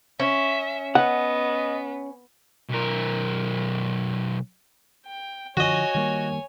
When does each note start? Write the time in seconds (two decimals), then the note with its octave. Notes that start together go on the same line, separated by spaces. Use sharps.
0.20 C#4 E5
0.95 B3 D#5 F#5
2.70 B1 A#4
5.07 G5
5.57 D3 F3 F#4 C#5 D#5 G#5
5.95 D#3 G3 A#3